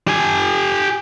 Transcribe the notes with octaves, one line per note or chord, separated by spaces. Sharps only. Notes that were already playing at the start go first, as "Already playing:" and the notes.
G4 G#5